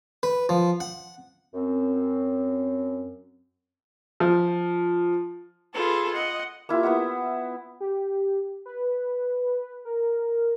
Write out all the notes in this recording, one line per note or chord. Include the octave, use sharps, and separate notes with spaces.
B4
F3
F#5
F#2 C4
F3
F4 G#4 A4 B4
D#5 F#5
A#3 E4 F4 G4
B3 E4 E5 F#5
G4
B4
A#4